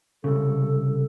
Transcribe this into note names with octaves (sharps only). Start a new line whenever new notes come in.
C2 F2 C#3 A4